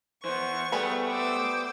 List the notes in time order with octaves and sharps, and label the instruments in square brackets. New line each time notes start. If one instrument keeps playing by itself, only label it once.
[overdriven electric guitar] E3 B3 [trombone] C5 [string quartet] C#6
[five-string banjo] G3 G#4 B4 [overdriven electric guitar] A3 [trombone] B3
[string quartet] C5 D6 E6